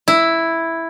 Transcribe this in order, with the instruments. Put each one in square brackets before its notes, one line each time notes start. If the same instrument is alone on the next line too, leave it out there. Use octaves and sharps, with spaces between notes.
[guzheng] E4